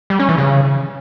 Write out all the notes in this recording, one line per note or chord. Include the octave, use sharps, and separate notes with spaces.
G3
C#4
E3
C#3